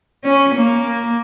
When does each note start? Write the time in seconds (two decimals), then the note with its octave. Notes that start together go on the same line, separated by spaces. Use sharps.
0.24 C#4
0.55 A#3